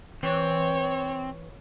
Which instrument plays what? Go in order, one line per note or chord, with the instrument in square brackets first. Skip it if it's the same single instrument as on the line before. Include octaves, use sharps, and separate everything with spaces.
[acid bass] E3 [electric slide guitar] C4 [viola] C#5